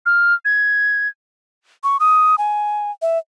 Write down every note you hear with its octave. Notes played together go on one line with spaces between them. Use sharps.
F6
G#6
C#6
D#6
G#5
E5